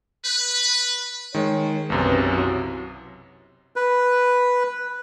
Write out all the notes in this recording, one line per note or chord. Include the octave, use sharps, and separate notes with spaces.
B4
D#3 G#3 C#5
B1 F#2 C3 C#4 B4
F#3 E4
B4